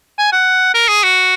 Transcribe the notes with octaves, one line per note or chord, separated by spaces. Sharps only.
G#5
F#5
A#4
G#4
F#4